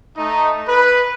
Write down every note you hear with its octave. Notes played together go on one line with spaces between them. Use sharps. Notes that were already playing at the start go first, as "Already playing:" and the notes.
A3 D#4
B4